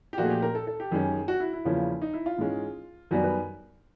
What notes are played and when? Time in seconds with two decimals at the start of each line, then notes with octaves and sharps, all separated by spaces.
0.13 G4
0.18 A#2 F3 A3 F#4
0.25 G#4
0.30 G4
0.42 A#4
0.55 A4
0.67 A4
0.80 G4
0.91 F#2 D#3 G#3 C#4
1.28 F#4
1.40 E4
1.53 E4
1.65 E2 C#3 F3 A#3 C#4
2.01 D#4
2.13 E4
2.26 F4
2.38 G#2 E3 G#3 C#4
3.11 F#2 D#3 G3 B3 F#4
3.24 B4